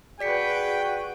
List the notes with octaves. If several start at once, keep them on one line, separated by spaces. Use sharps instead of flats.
F#4 G#4 B4 D5 G5 B6 C#7